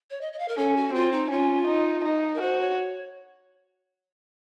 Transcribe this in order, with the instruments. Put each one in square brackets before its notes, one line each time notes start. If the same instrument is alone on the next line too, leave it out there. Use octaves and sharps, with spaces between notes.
[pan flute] C#5
D#5
D#5
F5
A#4
[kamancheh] C#4 [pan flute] A4
[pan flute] F#4
[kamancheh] C4 [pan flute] F4
[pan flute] D#4
[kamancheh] C#4 [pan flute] F4
[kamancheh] D#4
D#4
[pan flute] A#4
[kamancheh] F#4 [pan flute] C5
[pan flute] C#5